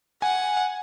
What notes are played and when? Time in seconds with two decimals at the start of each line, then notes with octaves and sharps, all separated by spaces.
0.22 F#5 G#5